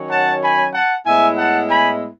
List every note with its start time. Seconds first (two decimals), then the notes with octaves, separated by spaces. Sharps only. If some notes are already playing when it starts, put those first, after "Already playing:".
Already playing: D#3 F#3 C#4
0.10 F#5 A5
0.41 G#5 B5
0.73 F#5 A5
1.06 A2 G#3 B3 E4 E5 G#5
1.37 F#5 A5
1.69 G#5 B5